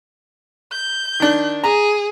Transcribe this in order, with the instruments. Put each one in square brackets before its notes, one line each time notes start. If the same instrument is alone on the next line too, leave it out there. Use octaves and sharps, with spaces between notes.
[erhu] G6
[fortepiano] D#3 D4
[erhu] G#4 [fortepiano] A#5